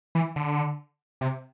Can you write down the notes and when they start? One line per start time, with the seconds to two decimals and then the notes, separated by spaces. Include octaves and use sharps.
0.15 E3
0.36 D3
1.21 C3